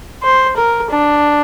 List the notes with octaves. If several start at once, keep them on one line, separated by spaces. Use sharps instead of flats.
C5
A#4
D4